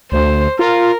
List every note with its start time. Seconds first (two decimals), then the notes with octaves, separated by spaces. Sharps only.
0.12 D2 C5
0.59 F4 A#4